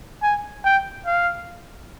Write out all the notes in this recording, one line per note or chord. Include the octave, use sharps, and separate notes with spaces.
G#5
G5
F5